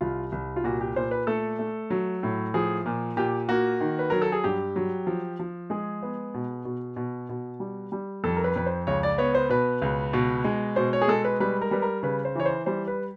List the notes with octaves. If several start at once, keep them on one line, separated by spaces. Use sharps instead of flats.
C2 F4
C2
F4
A#2 F#4
G4
A#2 C5
B4
A3 A4
A3
F#3
A2
F3 G#4
A#2
A#2 G4
A#3 F#4
D#3
B4
F#3 A#4
A4
G#4
G2 G4
F#3
F3
F3
G#3 G#4
B3
B2
B2
B2
B2
G3
G3
F2 A4
A#4
B4
F2 B4
C5
C#2 C#5
D5
B3 C#5
C5
B2 B4
C#2
B2
G#3
B2 C5
C#5
G#4
G#3 A4
B4
G3 B4
A#4
G3 B4
A#4
C#3 B4
C5
E3 C#5
C5
G3 C5
B4